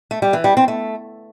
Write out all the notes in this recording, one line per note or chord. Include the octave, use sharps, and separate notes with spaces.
A3
G3
E3
G3
C4
A3